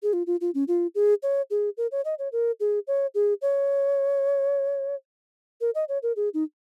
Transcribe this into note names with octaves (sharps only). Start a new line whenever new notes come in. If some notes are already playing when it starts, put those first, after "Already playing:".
G#4
F4
F4
F4
C#4
F4
G#4
C#5
G#4
A#4
C#5
D#5
C#5
A#4
G#4
C#5
G#4
C#5
A#4
D#5
C#5
A#4
G#4
D#4